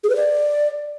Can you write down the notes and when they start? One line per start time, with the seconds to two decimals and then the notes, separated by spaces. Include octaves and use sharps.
0.03 G#4
0.09 B4
0.15 D5